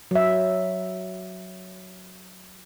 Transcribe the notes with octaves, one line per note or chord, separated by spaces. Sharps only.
F#3 E5